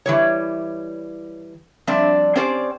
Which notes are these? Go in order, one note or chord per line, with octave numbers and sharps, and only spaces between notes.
E3 G3 C#5
F3 G3 C4 D4 D5 E5
C4 C#4 G4 C5 D5